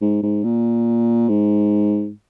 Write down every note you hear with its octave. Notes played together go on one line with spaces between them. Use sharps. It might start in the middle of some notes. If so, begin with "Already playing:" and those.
G#2
G#2
A#2
G#2